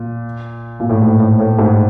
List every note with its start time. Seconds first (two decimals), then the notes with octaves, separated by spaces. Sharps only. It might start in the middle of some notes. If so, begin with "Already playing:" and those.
Already playing: A#2
0.80 A#2
0.89 A2
1.02 G#2
1.19 A2
1.39 A2
1.59 G#2